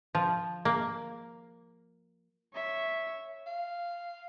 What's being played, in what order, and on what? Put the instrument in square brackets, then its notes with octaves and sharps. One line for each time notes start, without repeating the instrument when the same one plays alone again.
[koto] F3
A#3
[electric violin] C#5 E5
[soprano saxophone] F5